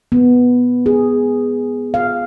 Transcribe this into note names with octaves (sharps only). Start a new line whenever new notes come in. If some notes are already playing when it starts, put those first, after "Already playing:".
B3
G#4
F5